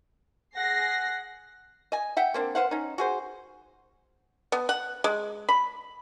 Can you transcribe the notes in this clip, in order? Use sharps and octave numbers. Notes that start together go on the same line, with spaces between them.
G#4 F#5 A#6 C7
D#5 G#5
E5 F#5 G5
A#3 C4 D4
B4 C5 F5 F#5
C#4 D#4
F#4 G#4 C5
B3
F#5
G#3
B5